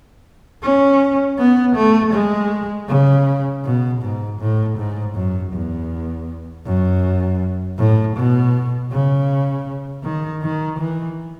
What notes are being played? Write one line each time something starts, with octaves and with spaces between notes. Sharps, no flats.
C#4
B3
A3
G#3
C#3
B2
G#2
A2
G#2
F#2
E2
F#2
A2
B2
C#3
D#3
D#3
E3